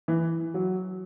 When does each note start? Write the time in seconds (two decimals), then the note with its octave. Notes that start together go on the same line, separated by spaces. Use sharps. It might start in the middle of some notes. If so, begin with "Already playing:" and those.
0.08 E3
0.54 F#3